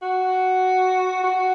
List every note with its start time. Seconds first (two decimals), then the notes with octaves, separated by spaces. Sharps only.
0.02 F#4
1.23 F#4